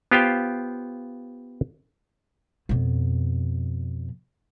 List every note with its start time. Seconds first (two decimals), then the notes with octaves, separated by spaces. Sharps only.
0.12 B3 F4 G4 C5 F5 G5
2.69 F2 B2